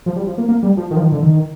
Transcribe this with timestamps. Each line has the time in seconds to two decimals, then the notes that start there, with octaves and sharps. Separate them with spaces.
0.06 F3
0.16 G3
0.27 F3
0.38 A#3
0.49 A#3
0.63 G3
0.77 F3
0.91 D#3
0.96 F3
1.02 D#3
1.12 D3
1.23 D#3